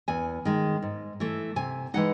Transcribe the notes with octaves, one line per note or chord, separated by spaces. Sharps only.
E2 G#5
D#3 G#3
G#2
E3 A3
C3 G#5
E3 G#3 D#4 F#5